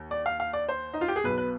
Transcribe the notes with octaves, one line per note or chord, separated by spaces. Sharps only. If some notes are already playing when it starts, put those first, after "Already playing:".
Already playing: D#2
D5
F5
F5
D5
C5
D#4
F4
G4
G#4
B1 B2 B4
B4